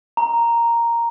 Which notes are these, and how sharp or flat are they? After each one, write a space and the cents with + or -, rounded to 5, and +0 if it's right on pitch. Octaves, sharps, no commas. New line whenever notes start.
A#5 +0